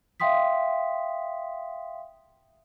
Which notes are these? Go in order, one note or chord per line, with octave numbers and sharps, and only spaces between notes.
E5 F5 G5 C6 D#6 B6